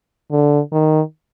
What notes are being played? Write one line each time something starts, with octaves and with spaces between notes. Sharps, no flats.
D3
D#3